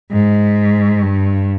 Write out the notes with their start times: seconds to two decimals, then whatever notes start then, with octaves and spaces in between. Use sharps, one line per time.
0.12 G#2
1.03 G2